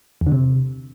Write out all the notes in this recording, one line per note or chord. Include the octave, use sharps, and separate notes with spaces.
E2
D3
C3